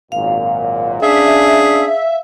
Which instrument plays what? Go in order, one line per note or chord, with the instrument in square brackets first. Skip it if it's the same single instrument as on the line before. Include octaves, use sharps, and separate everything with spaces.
[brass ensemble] G#1 F#2 A#2 [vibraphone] F5
[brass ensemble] C#4 D4 [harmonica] G#4 [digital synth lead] E5